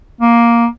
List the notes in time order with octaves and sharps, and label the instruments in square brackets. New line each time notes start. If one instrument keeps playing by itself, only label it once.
[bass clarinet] A#3